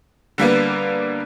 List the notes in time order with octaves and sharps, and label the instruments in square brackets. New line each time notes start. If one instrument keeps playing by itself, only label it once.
[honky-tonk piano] D3 G3 A#3 B3